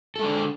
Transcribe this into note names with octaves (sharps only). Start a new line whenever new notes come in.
G#3 D4 A4